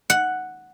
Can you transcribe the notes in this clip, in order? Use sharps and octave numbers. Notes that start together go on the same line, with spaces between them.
F#5